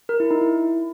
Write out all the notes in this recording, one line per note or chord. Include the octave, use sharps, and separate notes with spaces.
A#4
E4
D#4
E4